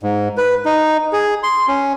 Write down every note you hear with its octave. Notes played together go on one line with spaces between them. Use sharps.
G#2
B4
D#4
G#4
C6
C#4